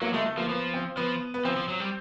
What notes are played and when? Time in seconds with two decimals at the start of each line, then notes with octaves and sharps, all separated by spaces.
0.01 F#3 A#3
0.14 G#3 A3
0.26 A3
0.37 F3 A#3
0.49 F3 B3
0.74 C4
0.97 F3 B3
1.34 B3
1.45 F3 C4
1.56 F3
1.68 F#3
1.80 G3